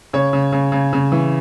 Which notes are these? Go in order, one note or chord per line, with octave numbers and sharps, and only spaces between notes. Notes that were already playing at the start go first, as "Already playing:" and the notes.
C#3 C#5
C#3
C#3
C#3
C#3
E3